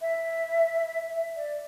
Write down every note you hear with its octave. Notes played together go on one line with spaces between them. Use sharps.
E5
D5